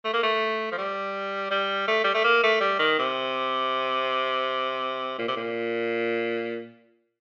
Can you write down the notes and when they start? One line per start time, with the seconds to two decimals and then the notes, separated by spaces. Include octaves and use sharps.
0.05 A3
0.14 A#3
0.23 A3
0.72 F3
0.78 G3
1.51 G3
1.88 A3
2.04 G3
2.15 A3
2.24 A#3
2.43 A3
2.61 G3
2.79 D#3
2.99 C3
5.18 A#2
5.28 C3
5.37 A#2